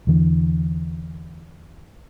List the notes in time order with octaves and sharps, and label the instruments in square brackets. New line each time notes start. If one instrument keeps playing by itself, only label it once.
[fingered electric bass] E2 D3 E3